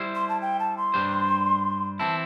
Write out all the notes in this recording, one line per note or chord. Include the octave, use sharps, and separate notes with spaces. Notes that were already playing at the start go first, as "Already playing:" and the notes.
Already playing: G3 E4 C5
C6
A5
G5
A5
C6
G2 G3 D4 C5
E3 C4 E4 A5